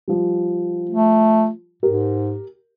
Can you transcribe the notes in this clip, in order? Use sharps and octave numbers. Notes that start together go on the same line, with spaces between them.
F3 G3
A3
G#2 G4 A#4